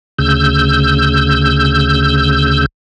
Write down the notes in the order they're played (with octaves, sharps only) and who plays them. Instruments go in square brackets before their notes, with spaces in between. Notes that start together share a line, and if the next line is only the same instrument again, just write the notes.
[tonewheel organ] D2 C#3 E6 G6